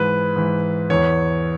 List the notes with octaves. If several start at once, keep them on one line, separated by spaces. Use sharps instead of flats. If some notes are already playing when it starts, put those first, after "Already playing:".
Already playing: G#2 E3 B4
G#2 E3
E2 E3 C#5